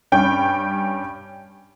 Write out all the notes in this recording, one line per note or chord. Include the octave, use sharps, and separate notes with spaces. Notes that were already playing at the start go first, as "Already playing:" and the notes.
G2 G3 C#4 G5